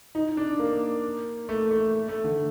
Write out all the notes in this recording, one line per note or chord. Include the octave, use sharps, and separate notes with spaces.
D#4
D4
A#3
A3
A3
A3
D3